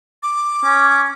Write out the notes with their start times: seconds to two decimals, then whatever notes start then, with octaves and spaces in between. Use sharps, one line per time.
0.23 D6
0.64 C#4